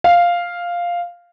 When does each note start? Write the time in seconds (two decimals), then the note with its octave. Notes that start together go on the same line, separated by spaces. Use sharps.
0.04 F5